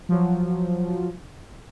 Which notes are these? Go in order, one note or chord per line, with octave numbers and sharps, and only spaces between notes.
F3 F#3